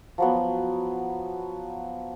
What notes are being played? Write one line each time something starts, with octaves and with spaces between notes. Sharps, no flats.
F3 F#3 B3